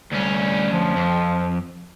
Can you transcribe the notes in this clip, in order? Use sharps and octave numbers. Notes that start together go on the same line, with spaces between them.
D2 G3 C#4
F3
F2